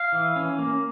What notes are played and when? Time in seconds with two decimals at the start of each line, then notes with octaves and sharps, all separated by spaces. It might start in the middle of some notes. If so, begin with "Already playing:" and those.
Already playing: F5
0.12 E3
0.36 C#4
0.59 A#3